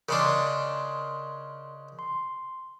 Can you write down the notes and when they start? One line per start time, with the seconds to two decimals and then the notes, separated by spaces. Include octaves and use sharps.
0.09 C#3 G#3 D4 A#4 C6
1.99 C6